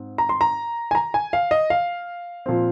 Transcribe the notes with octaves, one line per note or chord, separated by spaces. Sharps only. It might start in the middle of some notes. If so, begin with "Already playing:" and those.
Already playing: G#2 C4
A#5
C6
A#5
G#5
A#5
G#5
F5
D#5
F5
A#2 F3 C4